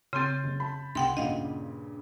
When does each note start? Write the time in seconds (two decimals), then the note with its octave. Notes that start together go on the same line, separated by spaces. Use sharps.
0.13 C#3 C4 C6 G6 A6
0.44 F#1
0.60 A5 B5
0.95 C2 F#5 G5 C6
1.17 G2 A#2 C#3 D#5 F5 F#5